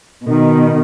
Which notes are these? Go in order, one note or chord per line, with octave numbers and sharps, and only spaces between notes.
B2 D#3